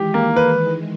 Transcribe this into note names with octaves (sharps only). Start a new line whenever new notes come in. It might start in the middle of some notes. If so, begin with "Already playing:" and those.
Already playing: D#3 E3 G#3 G4
A#3
B4